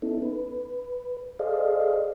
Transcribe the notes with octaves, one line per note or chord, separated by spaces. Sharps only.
B3 C#4 D#4 E4 A4
B4
G#4 A4 C5 D5 D#5 F5